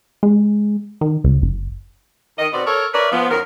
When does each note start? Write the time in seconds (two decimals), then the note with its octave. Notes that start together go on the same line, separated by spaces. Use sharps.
0.23 G#3
1.01 D#3
1.24 C#2
1.42 F#1
2.39 D#3 D#5
2.53 B2 B3 C4 D5
2.67 A4 A#4 C#5
2.94 A#4 B4 C#5 D5 E5
3.12 F3 B3
3.31 F#2 D#3 A#4